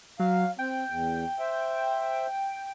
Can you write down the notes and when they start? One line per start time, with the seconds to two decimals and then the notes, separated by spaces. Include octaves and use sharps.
0.19 F#3 F5
0.59 C4 G5
0.89 E2
1.39 C5 E5